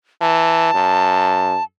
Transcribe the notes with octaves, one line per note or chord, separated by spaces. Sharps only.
E3 A5
F#2